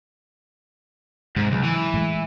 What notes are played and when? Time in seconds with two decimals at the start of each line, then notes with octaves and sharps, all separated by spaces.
1.36 G#2 C3
1.52 C#2 F#3 G#3
1.64 E3
1.94 A2 G#3